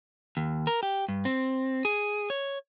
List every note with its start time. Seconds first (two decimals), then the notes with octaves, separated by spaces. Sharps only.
0.37 D#2
0.67 A#4
0.83 G4
1.08 G2
1.25 C4
1.85 G#4
2.30 C#5